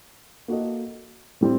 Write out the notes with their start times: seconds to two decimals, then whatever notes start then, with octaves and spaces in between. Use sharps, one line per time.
0.48 A#3 F#4 A4 D#5
1.41 A2 G3 C4